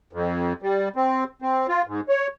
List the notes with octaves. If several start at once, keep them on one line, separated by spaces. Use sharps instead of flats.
F2
G3
C4
C4
F4
G#2
C#5